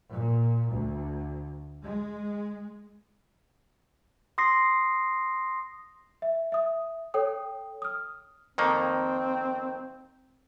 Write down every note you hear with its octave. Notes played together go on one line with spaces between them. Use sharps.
A#2
D2
G#3
C6 D#6 A#6 C7
E5
E5 D#6
A4 C#5 G5 D#6
D#6 F6
F2 D#3 A#3 C4